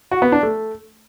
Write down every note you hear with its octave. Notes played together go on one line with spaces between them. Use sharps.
F#4
B3
D4
A3